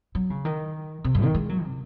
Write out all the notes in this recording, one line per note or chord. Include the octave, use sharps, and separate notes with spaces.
F#3
C#3
D#3
C3
F#2
D#3
G#3
F#3
C3